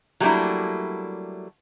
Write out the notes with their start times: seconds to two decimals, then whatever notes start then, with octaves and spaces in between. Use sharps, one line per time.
0.20 F#3 G3 A3 A#3 D4 E4